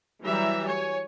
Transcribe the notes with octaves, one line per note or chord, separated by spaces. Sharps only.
E3 F#3 G3 E5 A#5
C#5 G#5